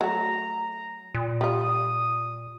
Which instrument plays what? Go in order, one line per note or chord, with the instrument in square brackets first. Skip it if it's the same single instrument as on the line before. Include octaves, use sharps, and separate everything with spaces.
[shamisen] F#3 A3 [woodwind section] A#5
[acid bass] A#2
[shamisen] G3 F4 [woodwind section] D#6